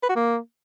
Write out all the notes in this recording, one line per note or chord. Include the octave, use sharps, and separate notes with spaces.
B4
F#4
A#3